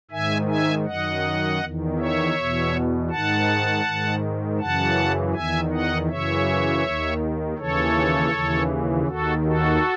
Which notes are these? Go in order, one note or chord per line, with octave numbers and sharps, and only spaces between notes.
G#2 D#3 E5 G#5
E5 G#5
F#2 D#3 D#5 F#5
E2 D#3
C#5 E5
E2 B2
G#2 D#3 F#5 A5
G#2 D#3
F#2 C#3 E3 F#5 A5
E2 D#3 E5 G#5
D#5 F#5
F#2 C#3 E3 C#5 E5
D#2 D#3
D#2 C#3 E3 A4 C#5
D#2 C#3 E3
D#2 D#3 F#4 A4
F#4 A4